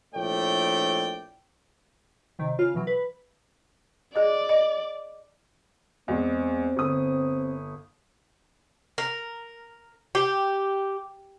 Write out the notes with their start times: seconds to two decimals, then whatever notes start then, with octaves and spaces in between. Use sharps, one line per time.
0.15 A#1 A3 E4 C#5 D5 G5
2.39 C3 D#3
2.59 C#3 F4 F6
2.75 B2 E3 F#3
2.87 B4
4.16 G#4 D5 D#5
4.49 D#5
6.08 E2 G#3 C4
6.77 G1 D#6
8.98 A#4
10.15 G4